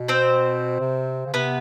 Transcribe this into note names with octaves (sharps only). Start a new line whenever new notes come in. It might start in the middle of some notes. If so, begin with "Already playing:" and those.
Already playing: B2
C4 C5
C3
C#3
C3 B3 B4